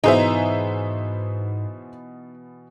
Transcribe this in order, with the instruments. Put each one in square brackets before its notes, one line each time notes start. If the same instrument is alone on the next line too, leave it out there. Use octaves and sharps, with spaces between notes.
[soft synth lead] G#2 [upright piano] B2 E3 B3 [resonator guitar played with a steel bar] D#4 [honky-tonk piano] G#4 C5 E5